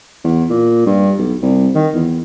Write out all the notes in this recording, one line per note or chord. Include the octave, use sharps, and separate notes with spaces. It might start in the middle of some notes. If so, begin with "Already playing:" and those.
E2
A#2
G2
B1
C2
D#3
E2